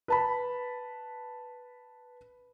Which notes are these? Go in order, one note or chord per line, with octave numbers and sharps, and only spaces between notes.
B4 A5 B5